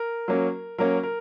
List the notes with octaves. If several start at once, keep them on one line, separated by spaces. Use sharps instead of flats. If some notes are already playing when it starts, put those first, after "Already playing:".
Already playing: A#4
F#3 A#3 C#4
F#3 A#3 C#4 A#4
A#4